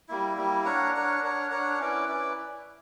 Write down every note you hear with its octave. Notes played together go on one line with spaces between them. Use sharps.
G3 A#3 E4
G3 A#3 E4
D4 A#4 C#5 F#5
D4 A#4 C#5 F#5
D4 A#4 C#5 F#5
D4 A#4 C#5 F#5
C#4 E4 B4 D5
C#4 E4 B4 D5